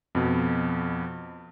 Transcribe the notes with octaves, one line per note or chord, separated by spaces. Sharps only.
F2 B2